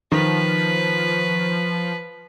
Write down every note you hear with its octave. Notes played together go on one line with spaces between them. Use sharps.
D#3 F3 B4